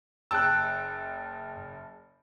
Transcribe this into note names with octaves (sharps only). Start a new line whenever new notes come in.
F#1 G5 A5 E6 F#6